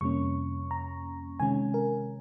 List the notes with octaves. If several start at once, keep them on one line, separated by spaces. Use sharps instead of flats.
F2 C3 G3 A#3 C#4 C#6
A#5
C3 D#3 G#3 C#4 G#5
A#4